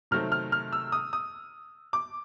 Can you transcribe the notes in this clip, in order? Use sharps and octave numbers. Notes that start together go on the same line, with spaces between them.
C3 D#3 F#3 A3 C4 F6
F6
F6
E6
D#6
D#6
D6